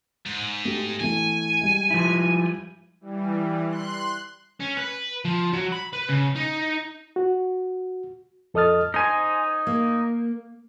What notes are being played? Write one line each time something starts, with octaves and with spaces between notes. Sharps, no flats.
G#2
A3 G4
E3 A3 G#5
G3 G#3
F3 E4
E3 G3
C6 F#6
C#4
B4
F3
F#3
B5
B4
C#3
D#4
F#4
F2 A4 D#5 D#6 F6 A6
D#4 C5 G#5
A#3